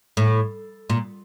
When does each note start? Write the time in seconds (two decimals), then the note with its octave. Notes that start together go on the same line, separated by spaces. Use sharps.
0.17 A2
0.90 A#2